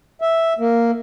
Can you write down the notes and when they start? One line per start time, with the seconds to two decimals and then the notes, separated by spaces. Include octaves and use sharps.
0.21 E5
0.59 A#3